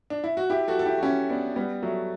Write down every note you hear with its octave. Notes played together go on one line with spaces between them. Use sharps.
D4
E4
F#4
E4 G4
F#4 A4
A4
E4 G4
F#4
C#4 E4
B3 D4
G3 B3
F#3 A3